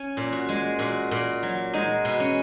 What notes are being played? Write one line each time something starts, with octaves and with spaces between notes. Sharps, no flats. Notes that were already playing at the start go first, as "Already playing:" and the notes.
Already playing: C#4
A#2
F#4
G#3
A#2 F#4
A#2
F#3
G#3 D#4
B2
C#4